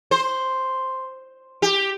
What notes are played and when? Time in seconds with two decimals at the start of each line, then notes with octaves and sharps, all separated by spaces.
0.11 C5
1.62 G4